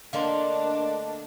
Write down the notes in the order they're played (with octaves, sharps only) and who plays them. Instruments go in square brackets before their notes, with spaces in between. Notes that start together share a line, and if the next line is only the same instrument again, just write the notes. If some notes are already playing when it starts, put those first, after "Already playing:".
[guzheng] D3 A#3 [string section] A3 D4 [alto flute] D#5 [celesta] F5 C6